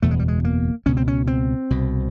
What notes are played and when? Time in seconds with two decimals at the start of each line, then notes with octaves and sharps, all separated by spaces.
0.02 F#1 E2 B2 A3
0.11 G#3
0.19 G3
0.28 G#3
0.45 A#3
0.86 C#2 B2 C#4
0.97 C4
1.08 C#4
1.27 C4
1.70 C2 B2